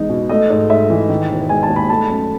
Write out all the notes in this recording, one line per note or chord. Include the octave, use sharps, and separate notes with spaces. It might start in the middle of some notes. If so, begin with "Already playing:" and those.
Already playing: E2 G#3 D#4
B2
A3 D#5
G#2
G#2 E5
E3
D#3
E1
G#3 G#5
A5
D#2
B5
A3 A5
F#2